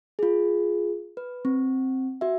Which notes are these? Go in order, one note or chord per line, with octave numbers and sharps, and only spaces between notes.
F4 G#4
B4
C4
F#4 E5